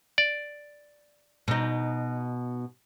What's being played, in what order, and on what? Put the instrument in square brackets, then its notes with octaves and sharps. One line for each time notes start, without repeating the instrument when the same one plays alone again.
[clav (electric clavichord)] D5
[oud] B2 D#4